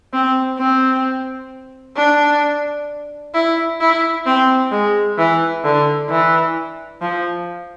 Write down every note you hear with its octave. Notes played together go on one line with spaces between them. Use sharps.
C4
C4
D4
E4
E4
C4
G#3
E3
D3
E3
F3